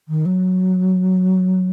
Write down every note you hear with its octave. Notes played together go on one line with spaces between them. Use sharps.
D#3
F#3